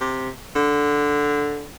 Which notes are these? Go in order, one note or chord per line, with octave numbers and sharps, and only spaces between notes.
C3
D3